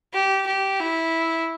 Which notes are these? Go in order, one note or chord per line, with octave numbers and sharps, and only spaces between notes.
G4
G4
E4